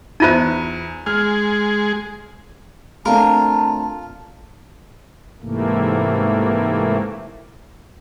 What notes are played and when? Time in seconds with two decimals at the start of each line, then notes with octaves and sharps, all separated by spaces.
0.20 E2 D#4 F4 C5 E5 D#7
1.06 G#3 G#4 F6
3.06 A3 C4 D4 F4 A#4 A5
5.41 G#2 C3 E3 A3 A#3